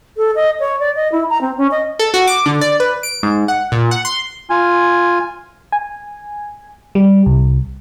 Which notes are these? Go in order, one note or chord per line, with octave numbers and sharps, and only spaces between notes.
A4
D#5
C#5
D5
D#5
E4
A#5
C4
C#4
D#5
A4
F#4
D6
D3
D5
B4
D7
G#2
F#5
A#2
F#5
C6
F4 G#5
G#5
G3
C2